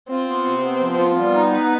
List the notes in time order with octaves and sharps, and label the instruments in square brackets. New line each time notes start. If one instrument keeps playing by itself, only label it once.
[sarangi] C4 [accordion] F4
[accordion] B3
C3
B3
F3
F4
[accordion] G3 [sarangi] B3
[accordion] D#4
B4